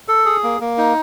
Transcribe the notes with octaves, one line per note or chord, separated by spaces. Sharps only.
A4
G#4
A#3
A#3
D#4